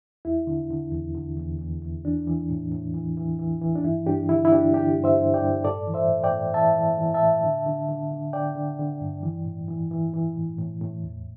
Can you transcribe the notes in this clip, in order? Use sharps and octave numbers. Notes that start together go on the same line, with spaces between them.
E2 E4
D3
D3
E2
D3
E2
E2
E2
E3 D4
E3
A2
A2
E3
E3
E3
E3
D4
G2 E4
G2 D4 G4
D3 E4
E4
G2 D4 G4
D3 D4 G4
G2
C5 E5
G2
D5 G5
G2
A2 A4 D5
E3
C5 E5
A2
D5 G5
A2
E3 E5 A5
E3
E3
E5 A5
A2
D3
D3
D3
D3
D3 D5 G5
D3
D3
G2
E3
A2
E3
E3
E3
A2
A2
A2
E2